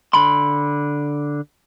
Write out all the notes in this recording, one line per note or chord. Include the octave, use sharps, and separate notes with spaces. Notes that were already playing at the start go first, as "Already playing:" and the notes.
D3 B5 C6